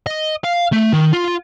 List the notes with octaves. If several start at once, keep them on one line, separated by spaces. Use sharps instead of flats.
D#5
F5
A3
D#3
F4